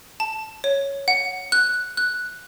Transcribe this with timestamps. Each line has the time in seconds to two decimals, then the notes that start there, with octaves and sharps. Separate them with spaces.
0.20 A5
0.64 C#5
1.08 F#5
1.52 F#6
1.97 F#6